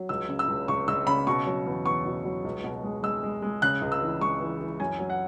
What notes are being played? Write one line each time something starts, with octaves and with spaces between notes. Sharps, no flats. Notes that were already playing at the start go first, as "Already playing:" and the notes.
Already playing: F#3
C#2 E6
C#3
E6
C#2
C#2 C#6
C#2 E6
C#3 B5
B2 C#6
F#3
E2
E2 C#6
B2
F#3
C#2
B2
G#3
G#3 E6
G#3
G#3
C#3 F#6
C#2
E6
E3
G#3 C#6
E3
E3
F#2 G#5
F#3
F#5